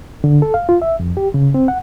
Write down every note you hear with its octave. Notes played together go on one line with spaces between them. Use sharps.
D3
A4
F5
F4
E5
F2
G4
C#3
C4
F#5